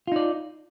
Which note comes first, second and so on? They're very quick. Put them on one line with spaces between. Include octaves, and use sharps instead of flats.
F4 D#4 D5